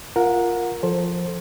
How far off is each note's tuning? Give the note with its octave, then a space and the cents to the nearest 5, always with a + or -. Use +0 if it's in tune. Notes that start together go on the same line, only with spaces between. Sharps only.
F4 +0 A#4 +0 F#5 -25
F3 +0 A4 +0 C5 +15